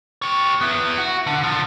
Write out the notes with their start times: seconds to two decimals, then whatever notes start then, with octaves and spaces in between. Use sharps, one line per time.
0.22 G4 C#5
0.61 B3 E4
0.98 F#4
1.27 D3
1.43 D3 F3